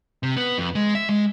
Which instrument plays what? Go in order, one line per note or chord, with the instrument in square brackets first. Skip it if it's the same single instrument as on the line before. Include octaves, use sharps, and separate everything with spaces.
[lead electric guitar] C3
B3
F2
G#3
E5
G#3